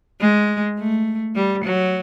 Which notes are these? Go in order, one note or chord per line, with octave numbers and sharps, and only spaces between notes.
G#3
A3
G3
F#3